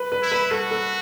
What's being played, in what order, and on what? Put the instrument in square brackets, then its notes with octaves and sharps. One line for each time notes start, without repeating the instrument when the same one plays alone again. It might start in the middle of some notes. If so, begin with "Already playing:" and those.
Already playing: [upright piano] B4
B4
[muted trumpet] E4
[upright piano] B4
[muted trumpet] F#4 [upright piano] A4
[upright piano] A4